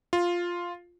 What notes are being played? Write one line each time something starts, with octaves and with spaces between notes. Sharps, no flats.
F4